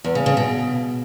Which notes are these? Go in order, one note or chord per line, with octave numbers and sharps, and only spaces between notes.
E2
C#3
C#3
B2